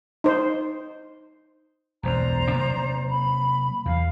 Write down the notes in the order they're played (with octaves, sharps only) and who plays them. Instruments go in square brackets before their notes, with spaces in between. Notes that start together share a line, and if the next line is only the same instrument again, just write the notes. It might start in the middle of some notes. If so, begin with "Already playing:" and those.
[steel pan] D#4 C5
[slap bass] E1 B1 F#2 [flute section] C5 D5 A#5
[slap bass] C3 F#3 A#3
[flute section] B5
[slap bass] E2 [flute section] F5